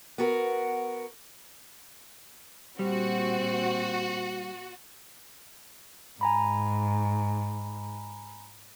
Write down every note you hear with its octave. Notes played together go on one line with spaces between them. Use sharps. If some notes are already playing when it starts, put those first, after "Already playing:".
B3 F#4 A#4
A#2 G3 C4 F#4
G#2 G#5 A#5 B5